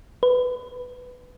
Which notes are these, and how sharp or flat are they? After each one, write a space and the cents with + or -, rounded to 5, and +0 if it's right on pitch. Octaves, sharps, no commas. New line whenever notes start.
B4 +10